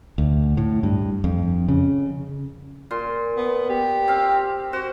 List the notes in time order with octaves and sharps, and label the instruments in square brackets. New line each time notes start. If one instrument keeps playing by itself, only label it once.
[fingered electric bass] D2
A2
G2
F2
C#3
[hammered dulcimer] A#2 C6
[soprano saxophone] B3
G4
[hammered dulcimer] C4 F5
[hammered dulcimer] F#4 [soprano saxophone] C5